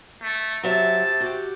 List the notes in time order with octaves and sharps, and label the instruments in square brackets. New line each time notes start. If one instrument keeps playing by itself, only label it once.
[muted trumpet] A3
[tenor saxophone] C3 [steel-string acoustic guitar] F#3 E5 [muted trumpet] A5
[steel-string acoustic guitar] F#4 G4